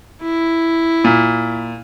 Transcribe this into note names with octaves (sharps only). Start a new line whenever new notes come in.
E4
A#2